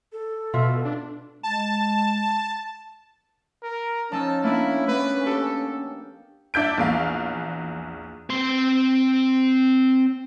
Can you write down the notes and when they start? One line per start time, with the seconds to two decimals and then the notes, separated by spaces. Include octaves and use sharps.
0.12 A4
0.54 B2 F4 E5
0.85 D4
1.43 G#3 A5
3.63 A#4
4.12 F3 C#4 D#4 A5 E6
4.43 A#3 B3 D4 E4
4.88 A#3 B3 B4
5.26 G4 A4
6.54 D4 E5 G6 D7
6.77 A#1 E2 F5
8.30 C4 C6